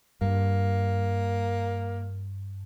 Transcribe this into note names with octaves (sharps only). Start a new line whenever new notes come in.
G2 A#3